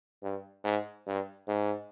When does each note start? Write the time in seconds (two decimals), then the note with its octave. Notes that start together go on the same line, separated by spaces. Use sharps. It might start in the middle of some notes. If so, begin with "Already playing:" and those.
0.23 G2
0.64 G#2
1.07 G2
1.48 G#2